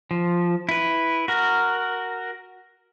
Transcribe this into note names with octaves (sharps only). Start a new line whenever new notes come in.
F3
E4 B4
F#4 A#4